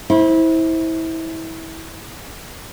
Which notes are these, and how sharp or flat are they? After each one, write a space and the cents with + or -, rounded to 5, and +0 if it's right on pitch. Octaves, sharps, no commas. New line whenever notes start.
E4 -25 C5 +10